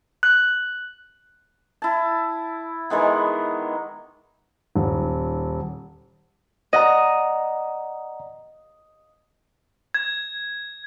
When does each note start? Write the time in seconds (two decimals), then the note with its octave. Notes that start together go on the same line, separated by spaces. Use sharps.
0.23 F#6
1.82 E4 A5
2.90 D#3 E3 G#3 B3
4.75 D#1
6.73 D5 D#5 F#5 A#5
9.94 G#6